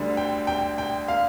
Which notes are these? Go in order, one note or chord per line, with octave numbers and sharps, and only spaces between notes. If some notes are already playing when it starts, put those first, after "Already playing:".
Already playing: D2 D3 G3
G5
G5
G5
F5